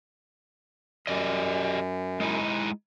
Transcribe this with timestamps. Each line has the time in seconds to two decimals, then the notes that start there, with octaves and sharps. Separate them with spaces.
1.07 F#2 G4 D5 D#5
2.20 G#3 D#4 E4